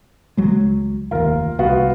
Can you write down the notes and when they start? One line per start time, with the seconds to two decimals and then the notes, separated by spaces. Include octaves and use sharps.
0.37 C#2 F#3 G#3
1.11 F1 D#2 F4 A#4
1.59 C2 B3 F4 F#4